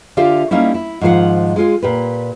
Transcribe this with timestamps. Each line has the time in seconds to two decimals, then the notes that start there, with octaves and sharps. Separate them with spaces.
0.17 D3 F4 G4 D5 E5 F5
0.51 G3 A#3 C#4 D#4 E4
0.74 E4
1.01 G#2 D#3 F3 A4 F5 F#5
1.56 G#3 F4 G#4
1.83 A#2 G4 B4